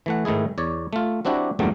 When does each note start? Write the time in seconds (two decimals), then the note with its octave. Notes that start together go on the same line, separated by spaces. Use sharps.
0.06 E3 A3 F#5
0.25 G#2 D#3 A3 E4 G#4
0.58 E2 C#5 D5
0.93 A3 F4
1.25 F#3 C4 D4 E4 F#4 G4
1.59 E2 G2 A#2 F#3 G3 A3